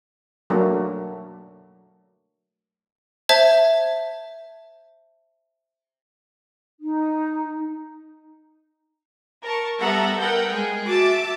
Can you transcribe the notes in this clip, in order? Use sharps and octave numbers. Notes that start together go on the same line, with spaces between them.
F#3 A3 A#3 D4
C5 E5 A5 G#6
D#4
A#4 A5 C#6
G3 B3 A4 E5 F#5 A#5
B3 A#4 F#5 G5 G6
G#3 G#4
F#4 E5 A5 D6